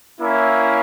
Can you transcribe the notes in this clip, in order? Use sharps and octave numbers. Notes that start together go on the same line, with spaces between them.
A#3 C#4 E4